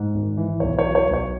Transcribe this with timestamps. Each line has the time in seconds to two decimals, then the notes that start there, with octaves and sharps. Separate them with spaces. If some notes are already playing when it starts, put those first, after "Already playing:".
Already playing: G#2
0.15 G#1
0.37 E3
0.60 B1 C#5
0.79 C#5
0.84 F#3
0.95 C#5
1.07 B1
1.14 C#5